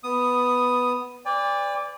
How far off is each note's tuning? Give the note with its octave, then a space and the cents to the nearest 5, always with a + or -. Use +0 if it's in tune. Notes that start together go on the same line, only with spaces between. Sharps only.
B3 +0 D#6 +0
B4 +35 D5 -10 G5 +45